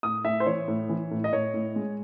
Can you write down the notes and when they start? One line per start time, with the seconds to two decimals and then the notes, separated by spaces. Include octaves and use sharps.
0.03 A2 D#6
0.24 A2 E5
0.40 C5
0.46 E3 C#5
0.68 A2
0.89 E3
1.11 A2
1.24 D#5
1.33 A2 C#5
1.54 A2
1.76 G#3